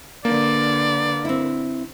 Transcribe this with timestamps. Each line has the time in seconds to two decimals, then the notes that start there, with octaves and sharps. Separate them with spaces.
0.25 D3 A#3 B4 D5
1.25 C4 E4